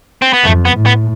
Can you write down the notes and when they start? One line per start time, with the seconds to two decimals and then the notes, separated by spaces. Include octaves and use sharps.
0.22 C4
0.33 B3
0.45 F2 A3
0.65 B3
0.75 A2
0.86 B3